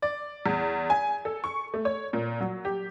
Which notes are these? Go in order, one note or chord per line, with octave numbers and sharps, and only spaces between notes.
D5
E2
G#5
A4
C#6
A3
C#5
A#2
F#3
G4